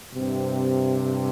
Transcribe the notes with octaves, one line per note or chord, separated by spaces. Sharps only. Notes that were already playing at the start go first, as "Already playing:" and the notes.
G2 C3